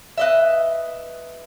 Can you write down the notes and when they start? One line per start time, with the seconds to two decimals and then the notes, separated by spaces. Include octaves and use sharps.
0.17 B4 D#5 E5